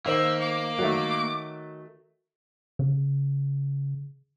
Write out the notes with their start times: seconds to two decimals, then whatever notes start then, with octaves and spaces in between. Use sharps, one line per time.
0.06 D#3 A#3 C5 E5 F#7
0.41 D6
0.79 D#3 F#3 A3
2.79 C#3